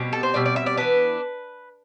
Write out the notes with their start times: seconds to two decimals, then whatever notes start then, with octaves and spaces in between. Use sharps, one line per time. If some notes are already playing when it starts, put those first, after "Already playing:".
Already playing: B2 G3 C4
0.13 A4
0.23 C5
0.34 B2 G3 C4 D5
0.46 D5
0.56 E5
0.66 D5
0.77 E3 B3 D4 B4